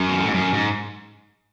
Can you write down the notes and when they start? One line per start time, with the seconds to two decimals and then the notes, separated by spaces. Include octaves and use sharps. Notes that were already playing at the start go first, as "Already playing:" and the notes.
Already playing: F#2
0.09 B2
0.18 A2
0.27 G#2
0.34 F#2
0.54 G#2